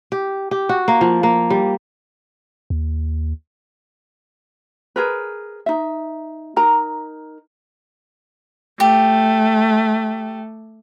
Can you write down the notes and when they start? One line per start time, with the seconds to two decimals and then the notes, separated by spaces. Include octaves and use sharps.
0.12 G4
0.51 G4
0.69 F#4
0.88 A#3
1.01 F3
1.23 A#3
1.50 G3
2.70 D#2
4.96 G#4 A#4 B4
5.66 D#4 E5
6.56 D#4 A#4 A#5
8.80 A3 G4